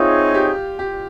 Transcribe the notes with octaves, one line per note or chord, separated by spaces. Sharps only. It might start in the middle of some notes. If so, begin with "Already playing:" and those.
Already playing: C4 D#4 F4 G#4 C#5 E5
G4
G4